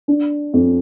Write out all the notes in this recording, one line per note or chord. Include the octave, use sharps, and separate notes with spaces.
D4
F2